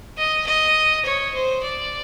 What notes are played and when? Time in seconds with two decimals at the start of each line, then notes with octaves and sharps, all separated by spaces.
0.18 D#5
0.46 D#5
1.05 C#5
1.34 C5
1.63 D5